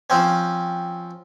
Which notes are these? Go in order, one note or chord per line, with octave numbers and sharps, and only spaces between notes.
F3 C4 C#4